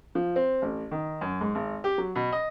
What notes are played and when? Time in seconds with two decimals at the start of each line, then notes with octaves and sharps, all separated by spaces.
0.15 F3
0.36 C4
0.62 A1
0.91 D#3
1.21 F#2
1.41 G#2
1.55 G#1
1.84 G4
1.98 F#3
2.15 B2
2.32 D#5